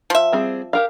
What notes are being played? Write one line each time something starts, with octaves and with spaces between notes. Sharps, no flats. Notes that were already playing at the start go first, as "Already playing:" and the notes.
F3 E5
G3 C4 G#4
G4 A#4 F5